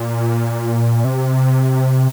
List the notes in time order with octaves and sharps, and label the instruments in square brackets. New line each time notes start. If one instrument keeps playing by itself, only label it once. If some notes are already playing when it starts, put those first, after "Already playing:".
Already playing: [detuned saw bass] A#2
C3